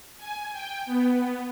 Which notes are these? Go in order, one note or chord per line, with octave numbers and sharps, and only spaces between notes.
G#5
G5
B3